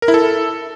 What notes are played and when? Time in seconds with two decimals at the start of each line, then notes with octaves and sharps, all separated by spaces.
0.02 A#4
0.08 E4
0.14 A4